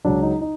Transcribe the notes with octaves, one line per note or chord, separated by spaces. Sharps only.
C#2 C#3 F#3 D4
D#4
D#4